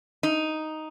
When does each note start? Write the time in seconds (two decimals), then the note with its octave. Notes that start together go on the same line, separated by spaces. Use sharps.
0.23 D#4